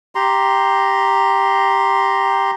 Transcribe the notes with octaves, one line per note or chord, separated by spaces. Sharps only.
G4 A#5 C6